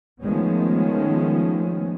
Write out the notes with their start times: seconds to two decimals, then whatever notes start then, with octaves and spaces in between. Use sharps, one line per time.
0.22 D#3 F3 G#3 A3 B3 C#4